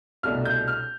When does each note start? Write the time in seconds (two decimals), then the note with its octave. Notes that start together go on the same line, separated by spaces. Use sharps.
0.23 C2 B2 A3 D4 F6
0.45 G6
0.68 F6